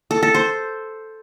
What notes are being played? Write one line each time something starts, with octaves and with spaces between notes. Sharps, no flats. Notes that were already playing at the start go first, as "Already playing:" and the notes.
A4
A4
C5